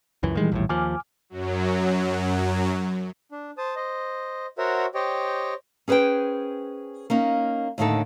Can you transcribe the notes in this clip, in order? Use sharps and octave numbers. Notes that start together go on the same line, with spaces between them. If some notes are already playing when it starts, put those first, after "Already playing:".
C#2 F#2 E3
A#2 D#3 E3 G3 G#3
A#1 D#2 A2
D#2 F3 G#5 D6 F6
F#2 F#3
D4
C5 A5 D#6
C5 D#5
F#4 A#4 C5 C#5 E5 F#5
G4 C5 C#5 D#5 G5
C#4 G#4 B4 C5 G5
A#3 C#4 D#4
D#2 A2 D3 D#4 A4